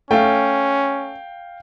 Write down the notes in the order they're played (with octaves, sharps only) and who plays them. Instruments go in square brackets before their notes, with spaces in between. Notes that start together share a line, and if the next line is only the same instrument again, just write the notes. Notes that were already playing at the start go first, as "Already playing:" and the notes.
[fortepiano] A3 [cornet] C#4 [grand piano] F5 G5